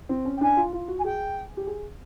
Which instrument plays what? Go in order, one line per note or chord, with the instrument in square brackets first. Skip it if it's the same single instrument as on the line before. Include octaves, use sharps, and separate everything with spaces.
[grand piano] C4
C#4
[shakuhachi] G5
[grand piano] D4 [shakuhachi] G#5
[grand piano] F4
F4
F#4
[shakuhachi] G#5
[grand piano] G#4 [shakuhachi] G5
[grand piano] G4
G#4